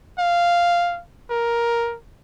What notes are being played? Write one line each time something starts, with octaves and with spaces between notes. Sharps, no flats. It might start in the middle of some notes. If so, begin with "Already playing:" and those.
F5
A#4